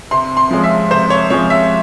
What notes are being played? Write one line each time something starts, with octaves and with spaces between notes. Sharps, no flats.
C3 C6
C6
F3 G#3 C#4
E5
C3 C5
C#5
F3 G#3 C#4 C#5
E5